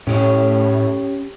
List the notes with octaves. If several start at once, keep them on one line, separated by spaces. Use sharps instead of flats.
A2 C#4 G4 C#5